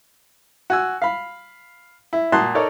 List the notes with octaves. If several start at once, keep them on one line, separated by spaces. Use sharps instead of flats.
F#4 G#5 E6
F5 B5
E4
A#2 F#4 A5 C6 D#6 F#6
D#4 A4 A#4 C#5 D5